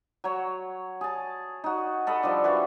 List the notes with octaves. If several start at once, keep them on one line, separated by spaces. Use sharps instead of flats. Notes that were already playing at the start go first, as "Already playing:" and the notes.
F#3 C#5
G#4 A5
D#4 F#4
A4 D#5 B5
F3 G3 D4
E3 F#4